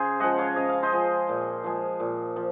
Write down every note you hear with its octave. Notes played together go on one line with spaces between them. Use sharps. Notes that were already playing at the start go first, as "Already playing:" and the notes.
Already playing: C#3 G#4 C5
F3 G#3 D#5 F#5
C#5 F5
C#3 D#5
F5
C5 D#5
F3 G#3
A#2
F3 G#3
A#2
F3